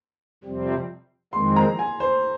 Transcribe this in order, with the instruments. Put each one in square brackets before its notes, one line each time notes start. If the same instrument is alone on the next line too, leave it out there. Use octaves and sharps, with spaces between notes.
[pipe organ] F2 C3 G3 C4
[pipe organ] F2 D#3 G#3 C4 [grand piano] C6
[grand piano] A#5
G#5
C5